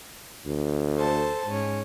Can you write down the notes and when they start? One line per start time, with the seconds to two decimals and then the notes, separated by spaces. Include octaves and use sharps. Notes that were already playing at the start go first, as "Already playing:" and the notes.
0.47 D2
0.96 A4 C5 A5
1.48 G#2 C#4